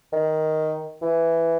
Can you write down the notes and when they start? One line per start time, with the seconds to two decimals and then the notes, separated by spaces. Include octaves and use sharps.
0.13 D#3
1.02 E3